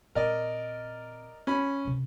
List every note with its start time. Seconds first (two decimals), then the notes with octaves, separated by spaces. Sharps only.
0.15 A#2 C4 A#4 D5 D#5
1.47 C#4 B5
1.85 F#2 C3